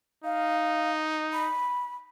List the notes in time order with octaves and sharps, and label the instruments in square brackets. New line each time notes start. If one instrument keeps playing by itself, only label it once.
[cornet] D#4 [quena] F5
[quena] B5